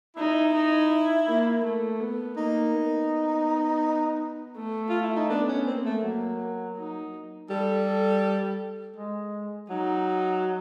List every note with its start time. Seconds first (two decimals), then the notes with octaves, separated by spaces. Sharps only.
0.17 D#4 E4
0.54 D#4
1.27 A#3
1.64 A3
2.00 B3
2.36 A#3 D#4
2.73 B3
4.57 A3
4.89 F4
5.03 E4
5.17 D#4
5.30 B3 D4
5.48 C#4
5.67 A#3 C4
5.85 A3
6.03 F#3 A#3
6.76 D#4
7.50 G3 A4
7.86 A4
8.96 G#3
9.70 F#3 D#4